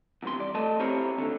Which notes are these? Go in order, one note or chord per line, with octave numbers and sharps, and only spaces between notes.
E2 G2 C3 C6
D5
A3 D#5 A5
C4 E4 G4 A#4 C5 C#5
D#2 D3